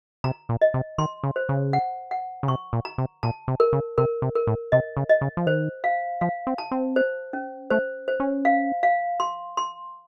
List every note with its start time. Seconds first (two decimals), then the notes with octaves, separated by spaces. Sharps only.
0.24 C3 A#5
0.49 A#2
0.62 D#5
0.74 C3
0.98 D#3 C6
1.24 C#3
1.36 C5
1.49 C#3
1.73 F#5
2.11 F#5
2.43 C#3
2.48 C3 C#6
2.73 A#2
2.85 A#5
2.98 C3
3.23 A#2 A5
3.48 C3
3.60 A#4
3.73 C#3
3.98 C3 A#4
4.22 C3
4.35 A#4
4.47 A2
4.72 C3 D#5
4.97 C#3
5.09 D#5
5.21 C#3
5.37 F3
5.47 D#3 C5
5.84 F5
6.21 F3 F5
6.47 C4
6.58 A5
6.71 C4
6.96 C5
7.33 C#4
7.70 A3 C5
8.08 C5
8.20 C#4
8.45 F5
8.83 F5
9.20 C6
9.57 C6